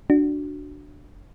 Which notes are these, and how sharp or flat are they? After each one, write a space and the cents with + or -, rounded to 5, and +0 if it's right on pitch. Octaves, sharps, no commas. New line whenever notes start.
D4 +0 F#4 +0